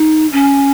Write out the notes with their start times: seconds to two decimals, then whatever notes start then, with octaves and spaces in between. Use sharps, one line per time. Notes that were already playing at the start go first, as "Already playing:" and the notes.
Already playing: D#4
0.32 C#4